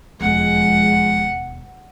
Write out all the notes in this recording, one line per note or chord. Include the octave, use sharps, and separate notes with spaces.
E1 D#2 F3 G#3 F#5